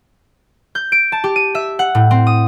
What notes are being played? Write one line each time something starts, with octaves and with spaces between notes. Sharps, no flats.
G6
D7
A5
G4
D#7
E5
F#5
A2
C4
D#6